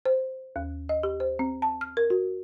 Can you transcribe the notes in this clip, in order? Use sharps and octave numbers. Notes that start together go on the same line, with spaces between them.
C5
D#2
D#5
G4
C5
C4
A5
F6
A#4
F#4